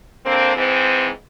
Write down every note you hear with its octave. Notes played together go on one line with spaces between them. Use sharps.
D3 A#3 C4
G#2 E3 C4